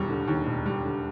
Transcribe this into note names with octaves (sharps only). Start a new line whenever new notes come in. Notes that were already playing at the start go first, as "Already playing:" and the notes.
Already playing: E1 D#2 G3
D3
D#2
E1
G3
D3